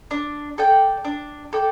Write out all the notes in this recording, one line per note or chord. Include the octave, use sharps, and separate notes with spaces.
D4
A4 D5 G5
D4
A4 D5 G5